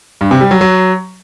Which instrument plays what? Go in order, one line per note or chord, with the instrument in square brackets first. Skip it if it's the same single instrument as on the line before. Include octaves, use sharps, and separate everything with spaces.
[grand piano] G2
C3
G3
F#3
F#3